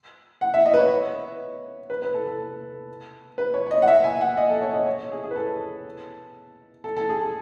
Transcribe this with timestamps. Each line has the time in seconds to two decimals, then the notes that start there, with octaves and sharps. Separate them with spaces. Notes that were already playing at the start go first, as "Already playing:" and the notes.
0.41 F#5
0.54 E5
0.66 D#5
0.74 B4
0.79 C#5
1.90 B4
2.02 B4
2.14 A4
2.27 A4
3.38 B4
3.54 C#5
3.67 C#5
3.71 D#5
3.82 F#5
3.88 E5
4.04 G#5
4.21 F#5
4.37 D#5
4.49 A4
4.62 C#5
4.74 D#5
4.86 C#5
5.11 G#4
5.24 G#4
5.31 B4
5.36 A4
6.84 A4
6.97 A4
7.09 G#4
7.22 A4